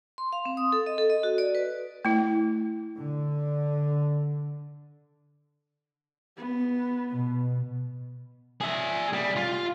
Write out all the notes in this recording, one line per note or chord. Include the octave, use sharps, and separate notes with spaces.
C6
F5
C4
D#6
A4
D#5
A4
D#5
F#4
D5
B4
A3 E4
D3
B3
B2
G#4 E5
G3
F4